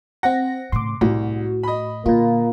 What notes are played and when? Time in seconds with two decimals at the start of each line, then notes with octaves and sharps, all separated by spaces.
0.23 C4 F#5 A#6
0.72 A2 C#3 C6 D6
1.01 C2 A2 F#4
1.63 D#5 B5
2.06 A#2 D3 A#3 F4